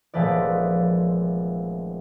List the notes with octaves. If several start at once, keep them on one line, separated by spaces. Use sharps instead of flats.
D#1 F3 G#3 A3 B4 D5